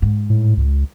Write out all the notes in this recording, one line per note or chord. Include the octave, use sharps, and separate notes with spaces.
G#2
A2
C#2